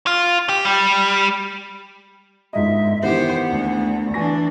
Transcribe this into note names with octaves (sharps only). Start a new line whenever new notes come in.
F4
G4
G3
G1 G#2 D#5 E5
D#3 E3 B3 G4 C5 F#5
D2
E3 D4 G#5 C#6 A#6